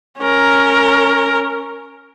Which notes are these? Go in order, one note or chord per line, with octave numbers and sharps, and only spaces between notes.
C#4 A#4